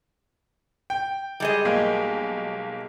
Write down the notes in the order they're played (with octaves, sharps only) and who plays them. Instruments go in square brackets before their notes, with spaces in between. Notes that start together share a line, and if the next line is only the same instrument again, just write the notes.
[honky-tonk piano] G5
[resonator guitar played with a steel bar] G3 G#3 D#5
[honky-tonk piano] B1 A#3